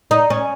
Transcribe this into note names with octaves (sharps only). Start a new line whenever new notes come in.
D#4
C#4